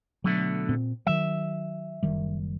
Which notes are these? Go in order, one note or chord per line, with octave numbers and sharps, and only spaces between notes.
B2 D3 F#3 A3
A#2 C4
D#3 F#3 E5
F#1 D#3 G3